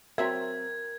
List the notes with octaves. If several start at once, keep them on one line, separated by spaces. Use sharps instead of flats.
F#3 C4 A#4 C#5 E5 G#6